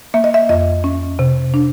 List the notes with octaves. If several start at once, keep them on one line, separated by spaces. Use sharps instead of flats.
A#3 E5
D#5
E5
F2 D#5
C#4
C3
D4